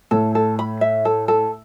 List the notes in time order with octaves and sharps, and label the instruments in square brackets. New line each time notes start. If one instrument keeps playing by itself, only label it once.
[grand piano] A2 [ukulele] A4
[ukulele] A4
B5
E5
A4
A4